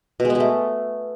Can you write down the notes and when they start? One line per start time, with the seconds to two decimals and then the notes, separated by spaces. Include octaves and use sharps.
0.20 B2
0.25 G#3
0.30 B3
0.35 G#3
0.40 A3